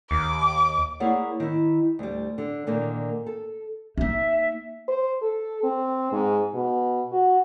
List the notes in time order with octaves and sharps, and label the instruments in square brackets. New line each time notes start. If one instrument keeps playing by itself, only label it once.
[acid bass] D#2 [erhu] D6
[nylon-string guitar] A#3 E4 G#4 C#5 D5 F#5
D#3 E4
D2 G3
D3
A#2 D3 D#3 A#3
A4
[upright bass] A#3 D#4 [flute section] E5
[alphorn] C5
A4
C4
G#2
B2
F#4